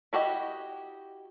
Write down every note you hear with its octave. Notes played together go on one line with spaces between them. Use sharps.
E4 F#4 G4 D#5